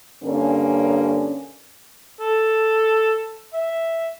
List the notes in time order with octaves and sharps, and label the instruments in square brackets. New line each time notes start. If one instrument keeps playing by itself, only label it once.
[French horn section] G2 D3 A#3 C#4
[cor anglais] A4
E5